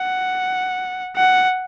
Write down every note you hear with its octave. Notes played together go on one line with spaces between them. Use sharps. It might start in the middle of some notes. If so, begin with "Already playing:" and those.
Already playing: F#5
F#5